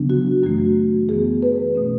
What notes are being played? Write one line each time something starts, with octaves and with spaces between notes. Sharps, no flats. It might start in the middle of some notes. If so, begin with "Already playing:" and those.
Already playing: C#3 F#3 B3 D4
F#4
F#2 E3 A3 F#4
F#2 E3 B3 G#4
B4
B2 A3 C#4